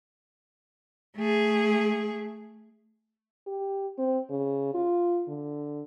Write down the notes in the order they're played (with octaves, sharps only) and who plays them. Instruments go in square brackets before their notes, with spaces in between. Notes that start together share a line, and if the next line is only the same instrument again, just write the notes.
[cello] A3 G#4
[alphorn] G4
C4
C#3
F4
D3